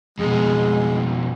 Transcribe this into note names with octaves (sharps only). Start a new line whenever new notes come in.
F2 B2 G#3